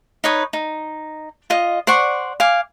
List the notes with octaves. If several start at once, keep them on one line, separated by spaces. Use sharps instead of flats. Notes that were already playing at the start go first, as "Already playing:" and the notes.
D#4 B4 C#5 D#6
D#4
F4 D#5
C5 D5 F#5 C#6
F5 G#5 D6